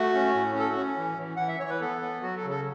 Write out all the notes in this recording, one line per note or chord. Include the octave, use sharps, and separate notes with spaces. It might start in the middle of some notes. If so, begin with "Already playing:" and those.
Already playing: A3 F#4
C#4
A2
C#4 A4
F#4
C#4
E3
E3
E3 F#5
E5
E3 C#5
B4
B3 A4
B3
F#3 F#4
A4
C#3
A4